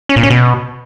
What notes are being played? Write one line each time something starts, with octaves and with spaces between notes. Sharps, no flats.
C#4
A#2
C#4
B2